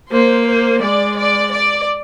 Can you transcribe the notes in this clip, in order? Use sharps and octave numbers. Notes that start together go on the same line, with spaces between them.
A#3 C5
C5
G#3 D5
D5
D5